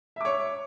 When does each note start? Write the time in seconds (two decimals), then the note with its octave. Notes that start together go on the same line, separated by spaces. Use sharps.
0.16 E5
0.21 D6
0.25 C#5